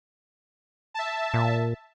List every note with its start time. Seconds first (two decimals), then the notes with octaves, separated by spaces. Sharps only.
0.94 E5 A5
1.34 A#2